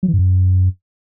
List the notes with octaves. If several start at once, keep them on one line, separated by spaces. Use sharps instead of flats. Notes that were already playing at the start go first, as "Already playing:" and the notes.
F#3
E3
G2
F#2